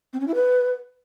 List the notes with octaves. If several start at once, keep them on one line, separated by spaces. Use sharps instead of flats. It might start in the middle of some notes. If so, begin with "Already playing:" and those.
C4
C#4
E4
B4